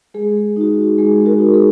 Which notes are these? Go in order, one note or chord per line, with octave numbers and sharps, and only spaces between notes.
G#3 G#4
D#4 F#4
G#3 G#4
F#4 A#4
D#4 F#4
G#4